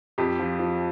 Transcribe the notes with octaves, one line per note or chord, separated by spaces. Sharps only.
F2 G4
F3
F3